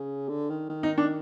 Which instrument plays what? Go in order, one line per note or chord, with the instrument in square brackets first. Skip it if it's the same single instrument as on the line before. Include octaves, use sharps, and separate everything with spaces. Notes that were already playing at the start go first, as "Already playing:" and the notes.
Already playing: [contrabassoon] C#3
D3
D#3
D#3
[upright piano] D#4
D4